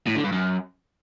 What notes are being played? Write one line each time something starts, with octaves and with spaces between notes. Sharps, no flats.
A2
D3
G2
F#2